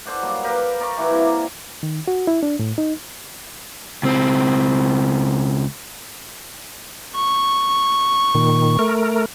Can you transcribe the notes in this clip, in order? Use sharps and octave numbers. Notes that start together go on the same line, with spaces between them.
A4 C5 D5 F#5
F#3 G3 A#3
G4 A#4 B4 F5
A#4 D5 A#5 C#6
E3 E4 F#4
C3 G3 A#3
D#3
F#4
E4
D4
A2
D#4
C#2 C4
C#6
A#2 D#3
A3 A#4